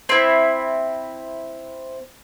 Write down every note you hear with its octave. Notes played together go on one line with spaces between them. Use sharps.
C4 E4